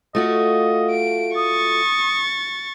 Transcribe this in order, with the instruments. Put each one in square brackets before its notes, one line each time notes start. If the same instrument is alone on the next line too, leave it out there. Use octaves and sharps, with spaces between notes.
[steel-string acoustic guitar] A3 F4 F#4 [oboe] D#5
[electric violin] D7
[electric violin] C#6 A6 [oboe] D#6